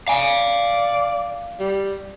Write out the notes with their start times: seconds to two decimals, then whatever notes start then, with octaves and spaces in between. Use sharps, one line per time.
0.08 D5 F5 G#5
1.59 G3